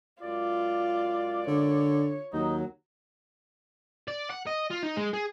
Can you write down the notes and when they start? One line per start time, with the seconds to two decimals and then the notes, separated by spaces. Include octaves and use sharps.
0.23 F#2 G#3 F4 D5
1.48 D3 C#5
2.33 D#2 F#3 D#4
4.08 D5
4.30 F#5
4.47 D#5
4.71 F4
4.83 D#4
4.97 G#3
5.14 G#4